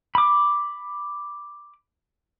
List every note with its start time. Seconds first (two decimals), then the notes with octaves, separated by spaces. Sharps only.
0.15 B5 D6